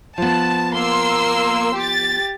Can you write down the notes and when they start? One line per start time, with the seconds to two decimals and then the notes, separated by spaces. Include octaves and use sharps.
0.18 F3 B3 A5
0.73 A#3 C6 E6
1.74 G4 A6